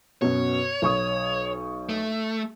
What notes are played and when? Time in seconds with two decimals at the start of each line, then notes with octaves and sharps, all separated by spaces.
0.22 F#2 B2 C#5
0.82 B1 C#6 D#6
1.89 A3